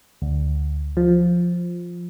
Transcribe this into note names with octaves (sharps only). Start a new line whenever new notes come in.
D2
F3